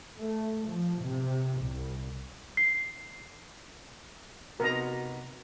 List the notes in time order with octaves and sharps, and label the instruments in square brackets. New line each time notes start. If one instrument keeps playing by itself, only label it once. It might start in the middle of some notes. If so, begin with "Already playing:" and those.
[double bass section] A3
F3
C3
C2
[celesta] C7
[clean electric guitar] C3 B3 D#4 [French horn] F#4 [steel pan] A#4 A#5